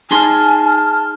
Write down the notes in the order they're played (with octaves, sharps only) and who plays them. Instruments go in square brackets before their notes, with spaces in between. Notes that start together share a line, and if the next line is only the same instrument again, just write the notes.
[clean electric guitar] D#4 G#4 C6 [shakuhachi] G#5 [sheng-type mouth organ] A5 [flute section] F6